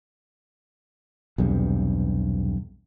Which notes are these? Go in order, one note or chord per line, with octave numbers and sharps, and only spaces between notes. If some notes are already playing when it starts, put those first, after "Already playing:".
B1 E2 G2 C3